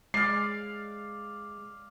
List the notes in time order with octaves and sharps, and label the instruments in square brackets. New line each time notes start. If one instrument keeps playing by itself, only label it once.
[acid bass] G#3 [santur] D5 F5 [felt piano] C7